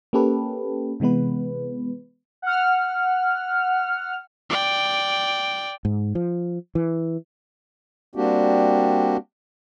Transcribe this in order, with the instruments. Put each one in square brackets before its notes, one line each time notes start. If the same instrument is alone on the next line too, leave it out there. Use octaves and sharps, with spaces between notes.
[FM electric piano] A#3 C#4 G4 A4 B4
C3 E3 G#3 B3 B4
[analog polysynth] F#5 F6
[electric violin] D5 G5
[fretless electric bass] G#2
F3
E3
[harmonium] G3 A#3 C4 D4 F#4 G4